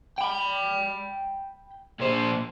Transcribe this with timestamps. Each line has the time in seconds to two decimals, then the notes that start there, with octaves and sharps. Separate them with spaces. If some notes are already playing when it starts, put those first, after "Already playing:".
0.19 G5 B5
2.00 A#2 C5